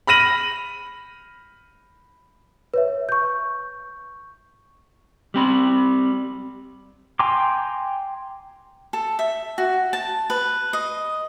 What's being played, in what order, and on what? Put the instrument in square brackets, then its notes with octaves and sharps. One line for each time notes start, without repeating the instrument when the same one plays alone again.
[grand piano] B5 F6 A#6 D#7 F#7
[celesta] B4 C#5 E5
C#6 G6
[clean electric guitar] G3 C4 B5
[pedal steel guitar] G5 G#5 A#5 C6 D6
[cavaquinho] A4
E5
F#4
A5
B4
D#5